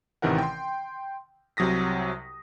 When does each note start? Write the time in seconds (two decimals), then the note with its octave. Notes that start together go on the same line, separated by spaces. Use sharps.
0.22 A1 C3 D#3 E3 A#4 F#5
0.38 G5 C6
1.57 C2 C3 F#3 D#6 A#6 B6